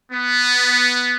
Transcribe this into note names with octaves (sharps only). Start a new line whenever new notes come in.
B3